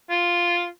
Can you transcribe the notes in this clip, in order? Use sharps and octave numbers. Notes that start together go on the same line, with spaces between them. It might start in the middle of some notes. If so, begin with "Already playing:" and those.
F4